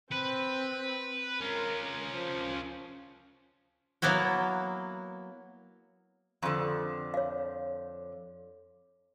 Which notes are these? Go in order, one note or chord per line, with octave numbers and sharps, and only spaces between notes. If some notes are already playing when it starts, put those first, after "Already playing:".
C4 B4
C#4 F4 A#4
F3
F#3 A#3 B3 E4 F#4
F2 D3 C#6
C#5 F5